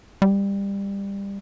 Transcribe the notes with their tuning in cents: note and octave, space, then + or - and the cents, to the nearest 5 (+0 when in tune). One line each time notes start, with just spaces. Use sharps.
G3 +20